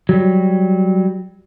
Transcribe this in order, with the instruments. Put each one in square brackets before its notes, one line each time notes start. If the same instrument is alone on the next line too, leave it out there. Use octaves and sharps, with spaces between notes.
[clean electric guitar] F#3 G3